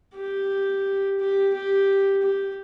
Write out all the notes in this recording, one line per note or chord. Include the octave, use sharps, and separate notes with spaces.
G4
G4
G4
G4